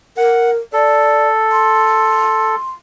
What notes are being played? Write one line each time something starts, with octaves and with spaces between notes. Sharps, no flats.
A#4 F#5
A4 D5
C6